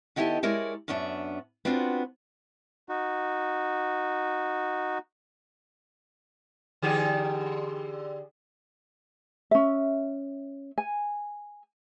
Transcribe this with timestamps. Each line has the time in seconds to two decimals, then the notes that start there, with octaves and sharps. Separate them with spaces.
0.16 D#3 B3 E4 G4 A4 D#5
0.43 G#3 E4 A#4 C#5 D5
0.88 F#2 B3 C#4 D4 E5
1.65 B3 C4 D4 F4 F#4
2.89 D#4 F#4
6.82 D3 G4 G#4
9.51 C#4 E5
10.78 G#5